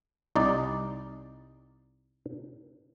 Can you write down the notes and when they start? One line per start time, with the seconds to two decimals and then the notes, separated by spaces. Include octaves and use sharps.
0.36 C2 D#4 D5